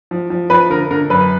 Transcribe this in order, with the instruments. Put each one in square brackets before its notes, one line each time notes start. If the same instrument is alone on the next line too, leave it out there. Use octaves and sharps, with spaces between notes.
[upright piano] F3
F3
F3 B4
D3 A#4
D3 A#4
F#2 B4